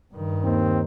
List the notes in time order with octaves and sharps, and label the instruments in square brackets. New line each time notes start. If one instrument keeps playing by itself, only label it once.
[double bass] G2 D#3
[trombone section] D#2 [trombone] C4